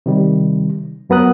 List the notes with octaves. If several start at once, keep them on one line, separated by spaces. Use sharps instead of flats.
C3 D#3 G3
F#2 F#3 B3 A#4 D#6 F#6